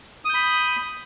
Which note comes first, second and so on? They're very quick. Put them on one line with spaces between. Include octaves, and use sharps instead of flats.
D#6 G6 B5